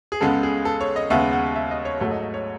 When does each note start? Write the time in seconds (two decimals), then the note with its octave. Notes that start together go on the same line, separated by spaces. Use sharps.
0.12 G#4
0.21 C#2 C#3 G#3 B3 A4
0.43 G#4
0.65 A4
0.81 C#5
0.96 D#5
1.10 D#2 C#3 G#3 B3 E5
1.33 F#5
1.56 E5
1.71 D#5
1.85 C#5
2.00 G#2 F#3 A3 C#5
2.11 D#5
2.22 D#5
2.34 C#5